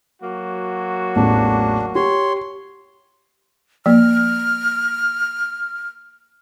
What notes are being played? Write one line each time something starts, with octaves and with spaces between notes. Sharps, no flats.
F#3 A#3 F#4
A1 E2 A2 D4
G4 C#5 C6
F3 A#3 F6